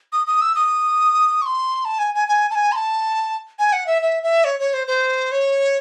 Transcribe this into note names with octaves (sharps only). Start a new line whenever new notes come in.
D#6
D#6
E6
D#6
C#6
C6
A5
G#5
G#5
G#5
A5
G#5
C6
A5
G#5
F#5
E5
E5
E5
C#5
C#5
C5
C5
C#5